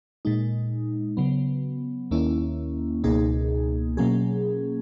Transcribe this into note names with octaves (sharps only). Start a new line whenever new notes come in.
A#2 G#3 D#4
C#3 F#3 B3
D#2 D#3 A#3 C#4 E4
C#2 B2 A#3 D#4 G#4
B2 F#3 A#3 C#4 G#4